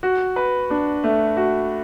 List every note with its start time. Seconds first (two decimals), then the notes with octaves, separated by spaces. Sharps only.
0.03 F#4
0.36 B4
0.70 D4
1.04 A3
1.37 F#4